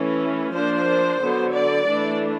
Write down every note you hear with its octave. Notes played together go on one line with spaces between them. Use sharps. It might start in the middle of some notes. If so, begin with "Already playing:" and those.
Already playing: E3 A3 C#4
F3 A#3 D4 C5
D3 F#3 B3
D5
E3 A3 D4